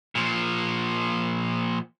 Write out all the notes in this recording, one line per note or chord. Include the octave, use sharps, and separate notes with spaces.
A#2 F3